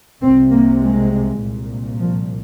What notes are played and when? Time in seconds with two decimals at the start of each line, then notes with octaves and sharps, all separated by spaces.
0.22 C2 C3 C4
0.51 A#3
0.81 G#3
1.40 C2 A#2
2.00 F3